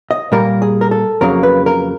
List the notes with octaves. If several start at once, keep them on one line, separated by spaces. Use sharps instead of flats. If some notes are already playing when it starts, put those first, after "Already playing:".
D#5
A#2 G3 A#3 A#4
G#4
A#4
A4
F2 C#3 F#3 A#3 A#4
B4
A#4